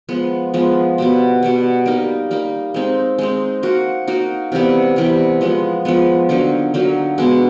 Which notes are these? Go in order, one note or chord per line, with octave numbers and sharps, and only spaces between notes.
F3 G#3 B3
F3 G#3 B3
B2 G3 B3
B2 G3 B3
G3 A#3 D#4
G3 A#3 D#4
G#3 C4 D#4
G#3 C4 D#4
A#3 D#4 F#4
A#3 D#4 F#4
C3 E3 G3 B3
C3 E3 G3 B3
F3 G#3 B3
F3 G#3 B3
D3 F#3 A#3 D#4
D3 F#3 A#3 D#4
B2 G#3 B3 D4